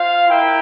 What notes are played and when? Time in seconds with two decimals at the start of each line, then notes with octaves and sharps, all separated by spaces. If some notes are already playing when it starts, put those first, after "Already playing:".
Already playing: F4 C5 F5
0.27 E4 A#4 E5 G5